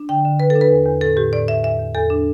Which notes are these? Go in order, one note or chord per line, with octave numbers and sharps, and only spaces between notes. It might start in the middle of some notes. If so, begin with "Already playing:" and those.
Already playing: D4
D3 G5
D3
D3 B4
A4
D4
B4
E2
E2
A2 A4
A2 G4
A2 D5
A2 E5
E2 E5
E2
E2 A4
D4